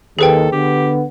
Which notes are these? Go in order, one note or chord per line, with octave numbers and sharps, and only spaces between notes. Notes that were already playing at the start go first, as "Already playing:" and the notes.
D#2 G#4 A4 B4 G5
D3 B3 G4